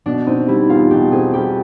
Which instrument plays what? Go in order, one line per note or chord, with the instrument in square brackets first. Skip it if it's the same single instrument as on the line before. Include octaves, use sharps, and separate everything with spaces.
[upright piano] B2 [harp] D4
[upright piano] C4 [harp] D#4
[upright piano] G3 [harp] E4
[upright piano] E2 [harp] F4
[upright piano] B2 [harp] G4
[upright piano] C4 [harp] G#4
[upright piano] G3 [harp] G4